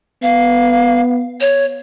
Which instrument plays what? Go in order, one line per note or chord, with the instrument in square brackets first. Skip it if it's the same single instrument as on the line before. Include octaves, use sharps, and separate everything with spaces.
[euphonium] B3 [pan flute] F5
[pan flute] C#5